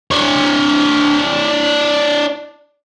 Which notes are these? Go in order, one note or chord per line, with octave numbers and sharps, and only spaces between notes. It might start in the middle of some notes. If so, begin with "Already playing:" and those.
D4 C#5